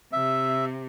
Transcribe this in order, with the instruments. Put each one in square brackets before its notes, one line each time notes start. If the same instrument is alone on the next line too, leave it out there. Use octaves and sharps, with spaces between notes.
[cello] C3 [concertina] E5